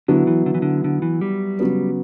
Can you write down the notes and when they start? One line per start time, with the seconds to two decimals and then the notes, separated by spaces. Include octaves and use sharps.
0.08 D3 F#3 B3 E4
0.27 E3
0.46 D3
0.54 E3
0.62 D3
0.84 D3
1.02 E3
1.21 G3
1.59 C#3 F#3 B3